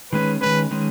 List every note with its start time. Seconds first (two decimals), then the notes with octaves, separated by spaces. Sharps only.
0.12 D#3 G#3 C#4 B4
0.41 D#3 G#3 C#4 B4
0.71 D#3 G#3 C#4